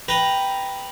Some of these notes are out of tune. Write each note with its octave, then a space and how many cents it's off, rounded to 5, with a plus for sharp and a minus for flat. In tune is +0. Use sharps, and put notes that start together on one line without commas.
B4 +0 G5 +0 A#5 +0